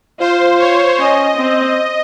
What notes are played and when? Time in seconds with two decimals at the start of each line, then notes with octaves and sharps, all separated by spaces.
0.20 F4 C5
0.59 C#5
0.98 C#4 D#5
1.37 C4